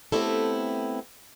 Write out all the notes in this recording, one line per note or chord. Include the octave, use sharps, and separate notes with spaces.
A3 B3 C4 E4 G4 A4